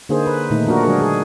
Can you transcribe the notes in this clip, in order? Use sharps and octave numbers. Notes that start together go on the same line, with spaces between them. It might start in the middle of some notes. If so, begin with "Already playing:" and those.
D3 A#3 D#4 G#4 C5
B4
A#2 D#3 A3 D#4
F3 D4 F#4 A#4
D3 F#3 G#3 D4 G#4 A#4
G#4